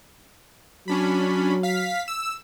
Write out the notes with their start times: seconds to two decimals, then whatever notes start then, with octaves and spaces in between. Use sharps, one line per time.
0.88 F#3 C#4 D4 B5
1.63 F5 B6
2.08 E6